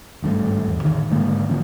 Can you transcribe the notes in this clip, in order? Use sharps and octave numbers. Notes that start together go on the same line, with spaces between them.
G#1 G2 D3 A3
A1 E2
A2 D3 D#3
G#2 D3 G#3 A#3
D3 F3 F#3 C#4